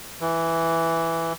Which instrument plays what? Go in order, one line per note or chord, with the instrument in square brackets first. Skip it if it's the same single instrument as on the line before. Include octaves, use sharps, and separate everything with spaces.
[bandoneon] E3